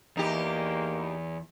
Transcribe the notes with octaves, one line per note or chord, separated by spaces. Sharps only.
E2 A#3 D#4 G4